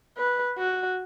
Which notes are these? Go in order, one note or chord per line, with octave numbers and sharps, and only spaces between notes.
B4
F#4